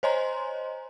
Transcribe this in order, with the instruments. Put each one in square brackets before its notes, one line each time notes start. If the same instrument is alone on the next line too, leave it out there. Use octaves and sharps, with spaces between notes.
[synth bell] C5 C#5 D#5 G#5 A#5 C6